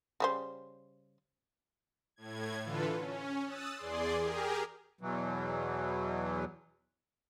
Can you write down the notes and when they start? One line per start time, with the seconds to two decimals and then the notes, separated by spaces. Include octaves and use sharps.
0.20 C#3 G3 C5
2.16 A2 G#6
2.64 D3 E3 F4 A4 B4
2.96 C#4
3.45 D#6 E6 F#6 A6
3.76 E2 G#4 D5 C6
4.21 G4 G#4 A#4
5.01 E2 B2 E3 F#3